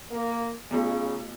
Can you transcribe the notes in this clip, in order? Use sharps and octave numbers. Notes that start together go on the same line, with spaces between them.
A#3
C#3 A3 B3 F4